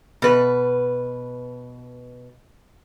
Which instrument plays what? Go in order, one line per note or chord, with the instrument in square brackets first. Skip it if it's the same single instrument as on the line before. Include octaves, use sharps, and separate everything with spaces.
[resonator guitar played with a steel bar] B2 B4